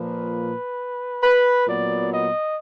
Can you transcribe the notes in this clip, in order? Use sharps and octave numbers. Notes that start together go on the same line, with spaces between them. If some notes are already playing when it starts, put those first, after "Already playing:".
Already playing: A#2 F3 A#3 B4
B4
A#2 F#3 B3 D5
D#5